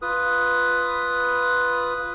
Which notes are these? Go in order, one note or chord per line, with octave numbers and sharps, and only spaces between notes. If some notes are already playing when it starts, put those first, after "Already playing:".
F4 B4 D#6